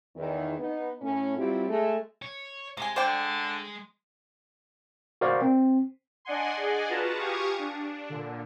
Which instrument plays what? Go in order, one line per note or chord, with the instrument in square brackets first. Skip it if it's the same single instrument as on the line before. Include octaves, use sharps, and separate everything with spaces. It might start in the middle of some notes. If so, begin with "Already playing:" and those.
[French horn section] E2 D#3
B3 D#4
A2 C#4
F#3 G3 C4 E4 F4 G4
G#3 A3
[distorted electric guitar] C#5
[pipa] C3 G#5 [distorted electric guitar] G#3
[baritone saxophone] D3 [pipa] C5 D5 G5
[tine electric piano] F#4 A#4 C5 D5 F5
C4
[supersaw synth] D4 D5 D#5 F#5 G#5 C6
G#4 D5 D#5 F#5 G#5
F4 F#4 B4 A5 A#5
G4 F5 G#5 C#6 D#6
D4
A#2 D3